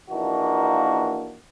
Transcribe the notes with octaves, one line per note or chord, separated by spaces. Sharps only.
A#1 E3 A#3 D4 D#4 F#4